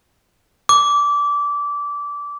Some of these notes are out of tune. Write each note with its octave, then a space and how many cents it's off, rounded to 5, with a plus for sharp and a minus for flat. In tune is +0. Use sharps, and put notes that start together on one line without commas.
D6 -20